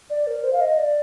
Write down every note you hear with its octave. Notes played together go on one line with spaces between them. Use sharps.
D5
A#4
C5
F5
D#5
D5